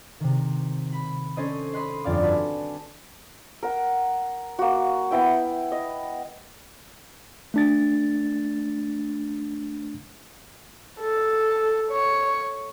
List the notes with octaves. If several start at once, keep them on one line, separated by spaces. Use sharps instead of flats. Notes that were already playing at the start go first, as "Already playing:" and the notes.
C3 D#3
B5
C#4 A4 C5 C#5 D#5
D#5 B5 C6 F#6 C7
G1 F2 D5 F5 D6
F#4 B4 G#5 A5
A#4 F#5
A#3 F#4
B3 E4 G5
D#5
A3 D4 A6
A4
C#5